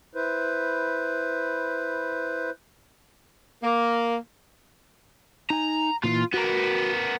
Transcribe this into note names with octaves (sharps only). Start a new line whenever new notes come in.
E4 B4 C5
A#3
D#4 G#5 A#5
A#2 D#3 E3 F4
B3 F#4 A#4 A#5